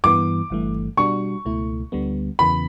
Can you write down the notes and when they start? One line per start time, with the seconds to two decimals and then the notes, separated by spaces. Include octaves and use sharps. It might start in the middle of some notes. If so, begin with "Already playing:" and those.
0.04 G2 E3 B3 D6
0.50 G1 G2 E3 A3
0.97 B2 G3 D4 F#4 C#6
1.45 C#2 B2 A3 E4
1.92 D2 D3 G3 B3
2.39 E2 C#3 E3 B3 B5